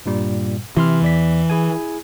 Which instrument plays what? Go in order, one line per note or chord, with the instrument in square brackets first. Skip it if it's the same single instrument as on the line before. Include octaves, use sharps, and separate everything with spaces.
[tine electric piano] G2 A#2 G3
[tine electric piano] C3 C6 F6 [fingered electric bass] E3
[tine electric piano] E2 D5 B6
E4 G#4 G#5